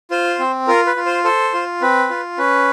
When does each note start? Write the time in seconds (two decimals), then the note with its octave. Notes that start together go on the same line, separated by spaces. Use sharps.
0.11 F4 C5
0.39 C4
0.67 F4 A#4
0.87 B4
0.96 F4
1.06 C5
1.24 A4 C5
1.53 F4
1.81 C4 B4
2.10 F4
2.38 C#4 B4